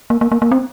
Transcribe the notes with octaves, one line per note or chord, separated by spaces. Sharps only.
A#3
A#3
A#3
A#3
C4